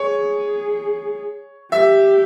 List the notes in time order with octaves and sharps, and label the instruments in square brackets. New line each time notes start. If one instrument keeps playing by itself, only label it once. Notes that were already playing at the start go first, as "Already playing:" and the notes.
Already playing: [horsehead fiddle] G#4 [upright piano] C#5
[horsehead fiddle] G4 [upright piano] E5